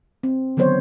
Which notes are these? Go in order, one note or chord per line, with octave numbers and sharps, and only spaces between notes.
C4
D3 D#3 F#3 B3 C5 C#5